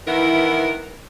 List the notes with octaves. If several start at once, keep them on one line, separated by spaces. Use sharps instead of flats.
D#3 E3 B3 E4 A#4